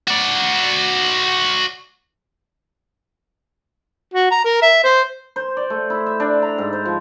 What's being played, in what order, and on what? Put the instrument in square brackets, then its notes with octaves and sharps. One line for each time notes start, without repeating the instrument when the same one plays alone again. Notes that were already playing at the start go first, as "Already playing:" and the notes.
[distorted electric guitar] F#4 D5
[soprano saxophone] F#4
A#5
A#4
E5
C5
[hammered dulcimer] C5
D5
A3
E4
E5
D4
A#5
G#2
C5
F3